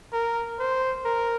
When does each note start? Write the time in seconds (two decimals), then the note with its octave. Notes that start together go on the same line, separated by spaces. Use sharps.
0.13 A#4
0.59 C5
1.05 A#4